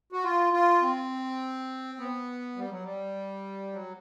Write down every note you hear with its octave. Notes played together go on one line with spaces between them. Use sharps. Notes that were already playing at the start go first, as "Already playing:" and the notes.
F#4
F4
F4
C4
B3
G3
F#3
G3
F#3